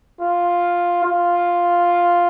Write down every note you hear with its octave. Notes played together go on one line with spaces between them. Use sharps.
F4
F4